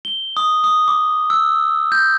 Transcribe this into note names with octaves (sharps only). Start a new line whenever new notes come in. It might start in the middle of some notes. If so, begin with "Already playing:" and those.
G7
D#6
D#6
D6
E6
G6